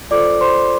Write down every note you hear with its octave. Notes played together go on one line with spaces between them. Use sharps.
F4 A4 C5 D5 D6
C5 C6